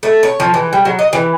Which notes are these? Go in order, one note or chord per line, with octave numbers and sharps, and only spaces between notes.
A3
C#5
F3
E3
G3
F#3
D#5
E3